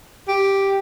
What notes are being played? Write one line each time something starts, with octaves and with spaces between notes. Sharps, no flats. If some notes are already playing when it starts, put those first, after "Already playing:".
G4